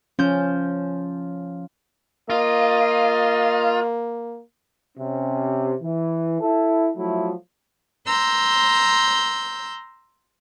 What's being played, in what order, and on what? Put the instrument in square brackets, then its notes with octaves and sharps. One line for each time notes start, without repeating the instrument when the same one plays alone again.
[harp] F3 G6 [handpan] C#4
[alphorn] A#3 [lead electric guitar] F4 [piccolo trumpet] D#5
[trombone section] C3 C#4
E3
E4 A4
F3 F#3 A3 E4
[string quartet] A#5 C6 E6 G6